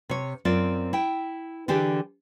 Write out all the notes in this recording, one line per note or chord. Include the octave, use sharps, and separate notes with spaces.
C3 C#5
F#2 C4 F4 D5
E4 G5
D3 E3 D4 G4 G#4